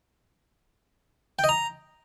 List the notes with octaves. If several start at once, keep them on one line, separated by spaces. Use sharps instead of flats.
G5
D#5
A#5